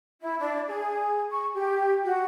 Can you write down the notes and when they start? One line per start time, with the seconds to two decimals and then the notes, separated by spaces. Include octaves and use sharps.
0.21 E4
0.40 D4
0.68 G#4
1.32 C#6
1.54 G4
2.04 F#4